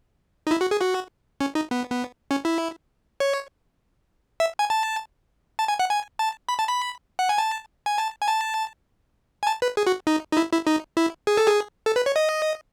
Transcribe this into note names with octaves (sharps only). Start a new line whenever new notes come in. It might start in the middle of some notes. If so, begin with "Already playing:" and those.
D#4
E4
F#4
G#4
F#4
C#4
D#4
B3
B3
C#4
E4
C#5
E5
G#5
A5
A5
G#5
F#5
G#5
A5
B5
A5
B5
F#5
G#5
A5
G#5
A5
G#5
A5
G#5
A5
B4
G#4
F#4
D#4
D#4
E4
E4
D#4
E4
G#4
A4
G#4
A4
B4
C#5
D#5